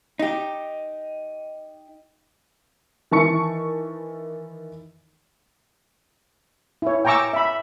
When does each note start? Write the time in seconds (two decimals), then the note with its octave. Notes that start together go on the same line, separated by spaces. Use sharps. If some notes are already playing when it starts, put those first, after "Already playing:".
0.19 D#4 G4
3.11 D#3 E3 A5 C#6 C#7
6.82 E4 C#5
7.05 G5 G#5 A#5 C#6 D6 E6
7.33 E5 B5